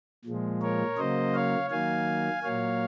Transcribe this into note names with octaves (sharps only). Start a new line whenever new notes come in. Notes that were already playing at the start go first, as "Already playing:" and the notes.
A#2 F3 G#3
A#4 C#5
C#3 F#3 A#3 C5 D#5
C#5 F5
D#3 F#3 A#3 F5 G#5
A#2 F#3 A#3 C#5 F5